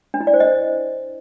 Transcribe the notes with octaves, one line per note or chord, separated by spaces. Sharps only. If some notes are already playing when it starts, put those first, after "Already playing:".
D4
E4
D5
C5
D#5